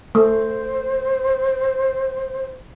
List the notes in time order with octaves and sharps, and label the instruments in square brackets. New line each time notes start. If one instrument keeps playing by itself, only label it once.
[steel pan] A3 [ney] C5